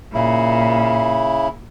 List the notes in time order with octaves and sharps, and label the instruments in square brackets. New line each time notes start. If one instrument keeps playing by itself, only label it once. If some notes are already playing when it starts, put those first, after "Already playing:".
[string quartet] A#2 [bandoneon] C#3 E4